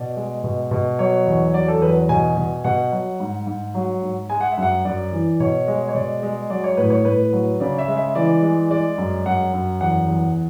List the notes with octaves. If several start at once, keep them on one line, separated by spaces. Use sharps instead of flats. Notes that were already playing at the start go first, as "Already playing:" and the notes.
Already playing: B2 D5
G#3
B2
B2
F#3 C#5
E2
F#3 D5
A4
E2 B4
B2 G#5
B2
B2 F#5
F#3
G#2
G#2
F#3
G#2
G#3 G#5
F#5
E5
F#2
F#5
F#2 D5
E3
B2 C#5
G#3
C#5
B2 D5
G#3
F#3 D5
C#5
A2 B4
C#5
A2 B4
F#3
C#3 D5
E5
G#3
E5
E3 D5
G#3
G#3 D5
F#2
F#2 F#5
F#2
E2 F#5
E2